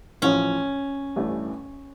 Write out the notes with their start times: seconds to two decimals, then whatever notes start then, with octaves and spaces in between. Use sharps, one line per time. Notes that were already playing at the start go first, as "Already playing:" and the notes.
0.22 A1 A2 F3 C#4
1.16 A1 G2 E3 A3